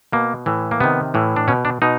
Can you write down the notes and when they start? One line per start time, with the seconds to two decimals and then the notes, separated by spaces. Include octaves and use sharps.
0.12 B2 A#3
0.46 A2 E3
0.71 A#3
0.80 C3 D#3 B3
1.14 A2 E3
1.36 D4
1.48 B2 C#4
1.65 D4
1.82 B2 D#4